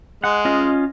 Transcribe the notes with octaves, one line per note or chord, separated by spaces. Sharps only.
G#3 F#5
C#4 F4 D#5